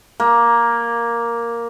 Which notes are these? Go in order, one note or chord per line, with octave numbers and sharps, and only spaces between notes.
A#3